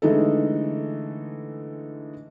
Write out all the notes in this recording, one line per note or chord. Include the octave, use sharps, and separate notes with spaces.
D3 E3 G#3 A3 D#4 A4